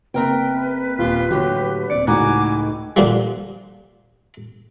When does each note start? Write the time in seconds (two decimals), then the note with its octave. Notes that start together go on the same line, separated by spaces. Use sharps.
0.14 F#1 C4 A#4 B4 G5
0.99 D#1 F4
1.31 A2 D3 F#3 G4
1.90 D#1 C4 D5 C#7
2.07 C#2 A2 D#4 F#4 G#5 D6 F#6
2.96 A#2 D3 F3 G3